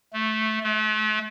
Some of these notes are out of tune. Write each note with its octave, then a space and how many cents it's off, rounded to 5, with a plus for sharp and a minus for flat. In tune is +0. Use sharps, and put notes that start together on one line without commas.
A3 -10
A3 -40